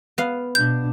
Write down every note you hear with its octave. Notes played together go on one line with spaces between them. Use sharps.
B3 F5
B2 D4 G6